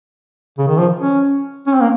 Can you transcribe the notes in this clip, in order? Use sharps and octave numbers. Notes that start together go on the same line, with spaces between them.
C#3
D#3
F3
C#4
C#4
C4
A#3